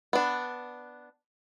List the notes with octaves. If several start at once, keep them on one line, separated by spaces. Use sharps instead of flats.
B3 D4